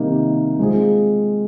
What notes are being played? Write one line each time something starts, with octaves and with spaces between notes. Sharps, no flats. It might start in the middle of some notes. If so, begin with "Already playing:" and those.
Already playing: C3 D#3 G3 A#3 D#4
G#3 C4 F4 G#4